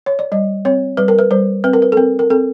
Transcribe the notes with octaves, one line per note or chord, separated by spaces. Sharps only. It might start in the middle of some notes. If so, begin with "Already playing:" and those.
C#5
D5
G3 D#5
C4 C#5
G3 B4
A#4
B4
G3 C5
C4 B4
A#4
B4
A4
C4 A#4
A#4
C4 A4